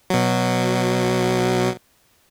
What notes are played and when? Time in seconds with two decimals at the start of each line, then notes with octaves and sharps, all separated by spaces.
0.10 B2 F#3